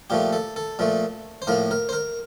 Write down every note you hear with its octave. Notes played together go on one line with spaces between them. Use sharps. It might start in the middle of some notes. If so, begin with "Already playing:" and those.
A#2 F3 A3 G4
A4
A4
A#2 F3 A3
C5
A2 F3 A#3 A#4
A#4
C5
A#4